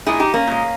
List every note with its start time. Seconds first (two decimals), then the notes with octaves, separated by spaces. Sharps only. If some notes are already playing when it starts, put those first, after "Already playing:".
0.06 A#2 G#3 E4 G#4
0.20 D#4 G4
0.34 A#3 C#4
0.47 A#2 G#3